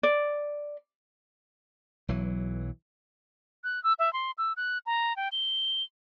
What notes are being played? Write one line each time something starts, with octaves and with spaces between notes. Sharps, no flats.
D5
B1 E3 F#3
F#6
E6
E5
C6
E6
F#6
A#5
G5
G7